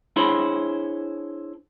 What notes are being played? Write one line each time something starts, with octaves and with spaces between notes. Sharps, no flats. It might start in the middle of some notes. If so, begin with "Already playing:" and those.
D4 E4 G#4 C5 C#5 B5